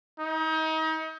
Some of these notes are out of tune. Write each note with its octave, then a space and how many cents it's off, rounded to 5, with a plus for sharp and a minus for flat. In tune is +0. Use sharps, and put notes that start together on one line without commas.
D#4 +35